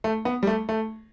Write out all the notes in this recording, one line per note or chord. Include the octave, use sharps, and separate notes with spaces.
A3
B3
G3
A3
A3